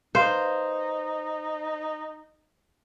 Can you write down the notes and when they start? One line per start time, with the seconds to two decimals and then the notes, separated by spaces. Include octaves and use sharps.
0.15 D#4 B4 C5 F5